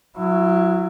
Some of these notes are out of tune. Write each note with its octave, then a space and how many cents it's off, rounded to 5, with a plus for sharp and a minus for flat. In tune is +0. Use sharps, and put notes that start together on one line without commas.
F#3 -15 E4 +25